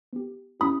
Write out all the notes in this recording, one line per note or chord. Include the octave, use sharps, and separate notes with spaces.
B3 G4
C#4 E4 G4 B5 D#6